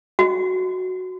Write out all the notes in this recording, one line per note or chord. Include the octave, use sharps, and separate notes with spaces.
F#4